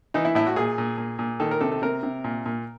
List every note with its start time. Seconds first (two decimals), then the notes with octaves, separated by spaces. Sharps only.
0.14 E3 D#4
0.25 E4
0.35 A2 E4
0.47 F#4
0.56 A#2 G#4
0.78 A#2
0.98 A#2
1.19 A#2
1.40 D#3 A4
1.51 A#4
1.61 C3 A4
1.71 A4
1.82 C3 A#4
2.03 C3
2.24 A#2
2.46 A#2